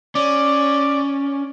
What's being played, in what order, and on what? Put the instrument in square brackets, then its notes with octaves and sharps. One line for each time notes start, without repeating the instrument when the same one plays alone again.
[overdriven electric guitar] C#4 [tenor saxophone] D5